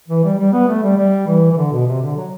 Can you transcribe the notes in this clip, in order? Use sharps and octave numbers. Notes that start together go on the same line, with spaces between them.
E3
G3
G3
B3
A3
G3
G3
E3
E3
D3
B2
C3
D3
F#3